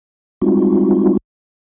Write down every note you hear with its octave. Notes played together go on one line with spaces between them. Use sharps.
G3 G#3 C4 D#4 F4 F#4